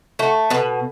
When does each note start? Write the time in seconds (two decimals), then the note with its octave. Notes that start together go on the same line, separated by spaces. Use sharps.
0.19 A3 F#4
0.50 B2 B4